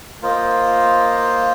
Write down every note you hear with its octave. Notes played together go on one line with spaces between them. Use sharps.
A#3 F4 C5 D#5